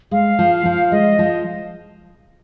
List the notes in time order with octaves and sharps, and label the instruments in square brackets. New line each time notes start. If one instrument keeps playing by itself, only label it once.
[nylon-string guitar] G#3 [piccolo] F5
[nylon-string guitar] F3
F3
[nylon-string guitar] G#3 [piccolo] D#5
[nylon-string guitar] F3